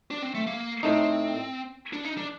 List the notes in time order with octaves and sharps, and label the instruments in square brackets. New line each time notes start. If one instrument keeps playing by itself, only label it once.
[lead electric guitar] D4
C4
A3
A#3
[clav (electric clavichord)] A2 A3 D#4 [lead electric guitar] C4
[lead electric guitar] D4
D#4
D4